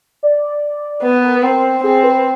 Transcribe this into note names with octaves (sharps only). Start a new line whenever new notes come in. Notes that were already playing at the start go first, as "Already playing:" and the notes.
D5
B3 B4
A#4
B4
C4 A#4
C4 G#4
B4